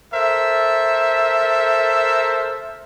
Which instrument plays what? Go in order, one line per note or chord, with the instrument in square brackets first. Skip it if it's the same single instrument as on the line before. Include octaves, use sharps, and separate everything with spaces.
[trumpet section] A4 A#4 C5 E5